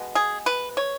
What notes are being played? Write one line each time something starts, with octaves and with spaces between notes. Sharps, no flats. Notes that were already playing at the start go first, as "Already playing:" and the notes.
Already playing: B2 G#3 B3
G#4
B4
C#5